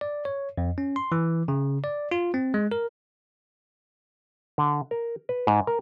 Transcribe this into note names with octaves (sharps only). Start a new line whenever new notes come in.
D5
C#5
F2
C#4
C6
E3
C#3
D5
F4
C4
G#3
A#4
D3
A#4
B4
G#2
A#4